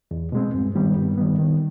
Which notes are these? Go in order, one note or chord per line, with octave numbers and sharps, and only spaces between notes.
E2
B2 G#3 C4
G2
D#3 G3 B3
G2
D#3 G3 B3
D#3